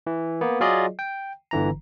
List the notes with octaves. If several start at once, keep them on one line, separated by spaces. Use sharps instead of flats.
E3
A#3 B3
F#3 F4 G#4 D5 D#5
G5
G1 D3 E3 A#5